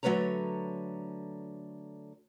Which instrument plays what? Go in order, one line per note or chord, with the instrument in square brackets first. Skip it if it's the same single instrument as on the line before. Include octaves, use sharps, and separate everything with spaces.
[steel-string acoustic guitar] D3 F#3 A3 B4 C#5 A#5